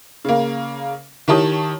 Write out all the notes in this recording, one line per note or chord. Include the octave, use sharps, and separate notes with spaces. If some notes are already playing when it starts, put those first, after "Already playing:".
C#3 A#3
D#3 E4 G4 C#5 A5 D#6